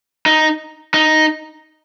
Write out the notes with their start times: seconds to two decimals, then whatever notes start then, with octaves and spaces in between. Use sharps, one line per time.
0.26 D#4
0.94 D#4